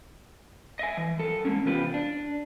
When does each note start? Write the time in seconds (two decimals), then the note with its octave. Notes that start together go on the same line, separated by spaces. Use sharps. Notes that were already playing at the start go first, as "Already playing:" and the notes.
0.79 D#5 E5 G#5
0.97 E3
1.18 F#2 A4
1.45 G2 B2 G#3 A#3 C#4
1.65 C3 E3 B3 F4 G4 B4
1.94 D4